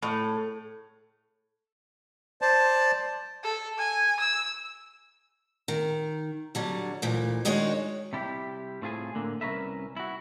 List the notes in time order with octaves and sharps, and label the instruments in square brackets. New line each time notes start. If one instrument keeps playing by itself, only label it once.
[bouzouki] A2
[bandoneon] C5 D5 A5
[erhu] A4
G#5
E6
[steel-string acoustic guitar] D#3
D3 F#3 G3
D2 A#2 E3
D#3 G#3 D4 D#4 F#4 C#5
[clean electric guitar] C3 G3 E4 G4
A2 C4 F4 G#4 G#5
A2 D3 A#3
C2 C#4 A#4 B4 E5
E4 F#4